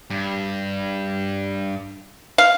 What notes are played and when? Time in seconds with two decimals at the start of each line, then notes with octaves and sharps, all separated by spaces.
0.10 G2
2.38 F5